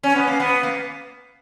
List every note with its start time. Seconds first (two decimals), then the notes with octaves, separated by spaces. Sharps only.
0.03 C#4
0.15 B3
0.27 A#3
0.40 B3
0.63 A#3